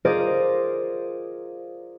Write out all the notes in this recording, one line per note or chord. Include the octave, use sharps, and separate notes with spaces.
F4 G#4 A#4 C5 D5 D#5